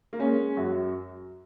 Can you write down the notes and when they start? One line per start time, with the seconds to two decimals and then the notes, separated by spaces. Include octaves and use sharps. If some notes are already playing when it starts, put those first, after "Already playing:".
0.13 A#3
0.19 G#3 C#4
0.57 F#2 F#4